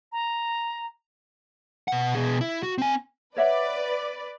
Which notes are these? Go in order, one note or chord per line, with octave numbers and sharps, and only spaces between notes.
A#5
B2 F#5
B2 G#4
E4
F#4
C4 G#5
B4 C#5 D5 E5 F#5